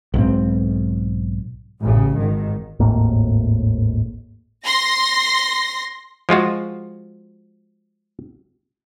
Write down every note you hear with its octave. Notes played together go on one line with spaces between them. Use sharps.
B1 G#2 C4
A1 C#3
G#1 D#3
G#1 D#2 A2 A#3
C6 A#6
F3 G#3 F4 F#4